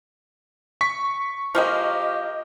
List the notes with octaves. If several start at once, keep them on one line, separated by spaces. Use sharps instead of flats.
C#6 B6
F3 G#3 A#3 G4 D#5 F6